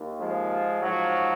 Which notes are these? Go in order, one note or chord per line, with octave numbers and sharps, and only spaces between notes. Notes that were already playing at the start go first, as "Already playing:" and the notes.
Already playing: D#2 D#3
F3 G#3
G#2 F3 F#3